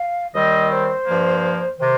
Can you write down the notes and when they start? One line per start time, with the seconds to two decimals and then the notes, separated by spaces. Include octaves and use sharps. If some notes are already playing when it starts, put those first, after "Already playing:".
Already playing: F5
0.34 D#2 D#3 G3 C4 D#5
0.70 C5
1.06 G2 F3 A#3
1.79 C3 D#3 C5